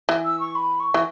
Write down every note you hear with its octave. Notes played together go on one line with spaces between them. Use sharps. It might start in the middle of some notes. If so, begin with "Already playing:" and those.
E3
E6
C#6
B5
C#6
E3